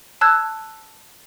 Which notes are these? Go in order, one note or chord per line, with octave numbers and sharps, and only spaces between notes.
A5 E6 F#6 G#6